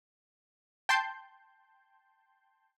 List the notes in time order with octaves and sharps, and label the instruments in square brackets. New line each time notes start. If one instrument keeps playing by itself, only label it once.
[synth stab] G5 A5 C6 G6